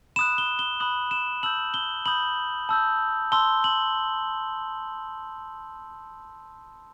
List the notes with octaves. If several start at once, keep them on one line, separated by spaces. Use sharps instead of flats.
B5 D#6 F#6 E7
G7
G7
B5 D#6 F#6 F#7
E7
A5 E6 G6 F#7
G7
B5 D#6 G6 F#7
A5 E6 G6
A5 C6 E6 G7
F#7